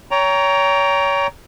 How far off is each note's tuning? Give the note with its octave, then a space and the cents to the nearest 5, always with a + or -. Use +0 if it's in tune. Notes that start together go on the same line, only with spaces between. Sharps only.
C#5 +30 G5 +0 A#5 +0